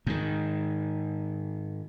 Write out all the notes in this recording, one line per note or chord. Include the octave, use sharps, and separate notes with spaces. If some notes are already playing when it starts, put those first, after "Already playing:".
G#2 D#3